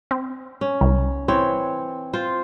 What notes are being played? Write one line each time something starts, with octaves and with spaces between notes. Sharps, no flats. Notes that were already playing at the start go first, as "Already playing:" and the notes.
C4
C#4
C2
E3 C4 C#5
F4 C5